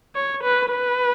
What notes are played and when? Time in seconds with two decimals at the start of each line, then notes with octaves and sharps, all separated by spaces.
0.15 C#5
0.44 B4
0.71 B4